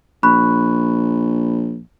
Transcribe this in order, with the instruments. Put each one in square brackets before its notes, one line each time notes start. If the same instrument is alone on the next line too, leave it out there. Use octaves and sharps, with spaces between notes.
[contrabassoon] A#1 [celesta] B5 C#6 F#6